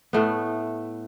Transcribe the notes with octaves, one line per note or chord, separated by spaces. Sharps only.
A2 A3 B3